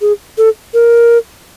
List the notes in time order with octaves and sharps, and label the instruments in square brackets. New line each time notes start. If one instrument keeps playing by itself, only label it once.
[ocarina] G#4
A4
A#4